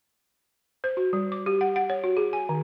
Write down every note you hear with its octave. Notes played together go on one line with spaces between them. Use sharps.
C5
F#4
G3
D6
G4
F#5
F#5
C#5
F#4
G#4
G#5
D#3